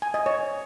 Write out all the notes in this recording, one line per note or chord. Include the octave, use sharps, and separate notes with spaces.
G#5
D#5
C#5